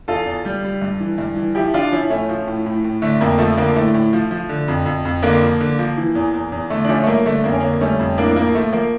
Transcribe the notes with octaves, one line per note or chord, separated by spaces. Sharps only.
E2 F4 A4
E2
G3
G3
G2
E3
G2
E3
F3 E4 G4
F3 D4 F4
F3 C#4 E4
A2 A3 C#4
F3
A2
A2
A2
D3 A3
F2 A#3
F3 A3
D3 A#3
A2 A3
A2
F3
F3
D3
F2
F2
F2
D3 A#3
F3
D3
F3
E3
E2
E2
E2
D3 A3
D4
F3 A3 C#4
A3
G2 A#3
D3 A3
F2 A#3
C#4
D3 A#3
G3 A3 C#4
F2
A2 A#3 D4
F3 A#3
F3 A3
F3 A#3